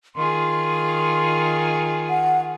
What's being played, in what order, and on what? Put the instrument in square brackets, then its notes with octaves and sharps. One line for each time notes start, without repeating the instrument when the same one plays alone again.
[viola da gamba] D#3 F4 G#4 [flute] C6
[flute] F#5